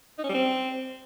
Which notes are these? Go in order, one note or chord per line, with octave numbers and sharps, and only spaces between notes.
D#4
C#4
G3
C4